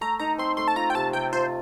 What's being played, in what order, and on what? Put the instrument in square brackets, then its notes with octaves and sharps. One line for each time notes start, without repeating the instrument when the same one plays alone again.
[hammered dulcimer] A3 [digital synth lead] A#5
[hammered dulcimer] D#4 [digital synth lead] A#5
[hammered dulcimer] C4 [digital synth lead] C6
[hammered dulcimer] A3 [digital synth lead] C6
[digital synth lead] A5
[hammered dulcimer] F4 [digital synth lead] A#5
[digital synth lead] G5
[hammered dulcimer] C3 [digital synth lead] A5
[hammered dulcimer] C3 [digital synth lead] G5
[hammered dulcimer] F4 [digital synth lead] C5